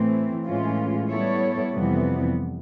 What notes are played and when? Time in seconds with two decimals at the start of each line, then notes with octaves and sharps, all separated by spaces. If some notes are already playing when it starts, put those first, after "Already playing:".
Already playing: A2 E3 A3 C4
0.46 A2 E3 G#3 C#4 F4
1.09 G3 B3 E4 A4 C#5
1.73 F2 C3 E3 G3 B3